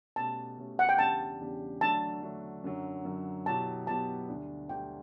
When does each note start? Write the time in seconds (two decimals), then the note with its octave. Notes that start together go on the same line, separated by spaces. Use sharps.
0.16 B2 A3 C#4 G4 A5
0.57 B2 A3 C#4 G4
0.79 F#5
0.89 G5
0.99 E2 C#3 G3 D4 G4 A5
1.40 E2 C#3 G3 D4 G4
1.81 D3 F#3 A3 D4 A5
2.22 D3 F#3 A3 D4
2.64 F#2 D3 F#3
3.05 F#2 D3 F#3
3.46 B2 F#3 B3 E4 G4 A5
3.87 B2 F#3 B3 E4 G4 A5
4.28 D2 D3 G3 D4
4.69 D2 D3 G3 D4 G5